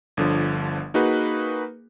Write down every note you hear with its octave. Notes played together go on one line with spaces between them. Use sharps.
G1 D3 F3
A#3 D#4 F#4 G#4 B4